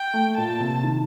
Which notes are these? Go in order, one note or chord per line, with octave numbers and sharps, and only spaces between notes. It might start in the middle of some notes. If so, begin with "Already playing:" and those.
Already playing: G5
A3
A#2 A5
C3
D#3